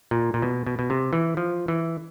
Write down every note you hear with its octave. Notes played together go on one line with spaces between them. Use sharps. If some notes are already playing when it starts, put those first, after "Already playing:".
A#2
A#2
B2
B2
B2
C3
E3
F3
E3